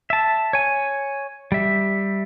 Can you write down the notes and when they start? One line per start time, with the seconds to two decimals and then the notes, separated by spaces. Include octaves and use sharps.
0.10 E5 A5
0.53 C#5 G#5
1.52 G3 E5